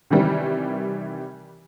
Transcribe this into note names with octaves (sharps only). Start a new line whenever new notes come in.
C3 D#3 E3 G3